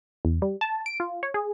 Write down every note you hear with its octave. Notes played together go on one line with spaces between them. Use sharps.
E2
G3
A5
D7
F4
C#5
G#4